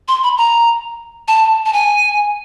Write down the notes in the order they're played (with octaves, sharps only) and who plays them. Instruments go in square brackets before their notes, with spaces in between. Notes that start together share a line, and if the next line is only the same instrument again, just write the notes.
[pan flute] C6
B5
A#5
A5
A5
G#5